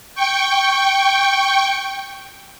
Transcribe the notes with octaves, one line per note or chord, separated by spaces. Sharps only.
G5 C#6